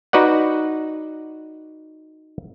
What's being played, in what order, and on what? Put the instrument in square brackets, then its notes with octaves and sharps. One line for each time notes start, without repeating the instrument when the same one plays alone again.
[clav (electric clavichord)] D#4 F#4 B4 D5 F#5